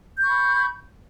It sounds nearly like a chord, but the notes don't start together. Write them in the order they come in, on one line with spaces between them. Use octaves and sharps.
G6 C#6 B5